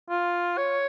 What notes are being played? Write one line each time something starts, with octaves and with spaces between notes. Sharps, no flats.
F4
C#5